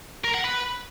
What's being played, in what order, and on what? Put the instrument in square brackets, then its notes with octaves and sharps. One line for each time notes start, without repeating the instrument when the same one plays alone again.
[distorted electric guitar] A#4
F#5
B4